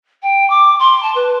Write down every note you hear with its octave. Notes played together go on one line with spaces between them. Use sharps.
G5
D6
C6
A5
B4